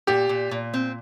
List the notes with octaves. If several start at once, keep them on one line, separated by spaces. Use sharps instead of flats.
A#2 G4
A#2
A#2
C4